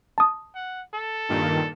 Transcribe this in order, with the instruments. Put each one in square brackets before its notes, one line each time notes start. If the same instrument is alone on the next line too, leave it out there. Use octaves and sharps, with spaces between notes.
[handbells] A5 D#6
[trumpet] F#5
A4
[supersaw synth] G2 A#2 D#3